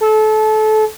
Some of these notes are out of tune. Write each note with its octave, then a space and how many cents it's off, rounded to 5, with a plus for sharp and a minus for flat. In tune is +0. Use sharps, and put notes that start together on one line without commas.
A4 -25